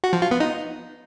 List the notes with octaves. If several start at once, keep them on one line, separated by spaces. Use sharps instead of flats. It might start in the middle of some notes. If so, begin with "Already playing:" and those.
F#4
F3
F4
B3
D#4